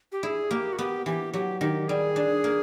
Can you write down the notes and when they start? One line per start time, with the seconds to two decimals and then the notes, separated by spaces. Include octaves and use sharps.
0.12 G4
0.23 E4 G#4
0.51 A#3 G4
0.73 F#4
0.78 B3 G4
1.06 E3 G4
1.33 F#3 G4
1.61 D#3 G4
1.88 G3 G#4
2.16 D4
2.44 A#3